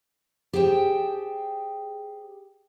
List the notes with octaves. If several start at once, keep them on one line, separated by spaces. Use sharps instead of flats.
G4 G#4 C5 G5 A5